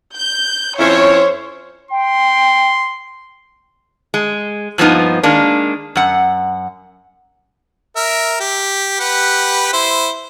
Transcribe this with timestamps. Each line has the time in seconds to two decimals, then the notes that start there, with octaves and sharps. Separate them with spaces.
0.15 G6
0.79 F2 C#4 E4 C5 C#5
1.91 G5 C6
4.14 G#3
4.78 G2 F3 A#3 B3 D#4
5.23 D#3 G#3 A#3 D4
5.96 F#2 F#5
7.96 A#4 E5
8.40 G4
9.00 G4 B4 F#5
9.73 E4 C5